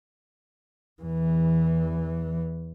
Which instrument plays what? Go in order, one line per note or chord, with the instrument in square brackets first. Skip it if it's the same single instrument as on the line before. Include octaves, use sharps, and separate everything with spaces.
[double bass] E2 E3